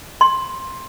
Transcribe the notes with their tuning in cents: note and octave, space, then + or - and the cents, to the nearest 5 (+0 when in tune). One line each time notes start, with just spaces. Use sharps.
C6 +10